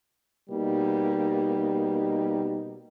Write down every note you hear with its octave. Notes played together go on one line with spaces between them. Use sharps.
B2 G3 A#3 D#4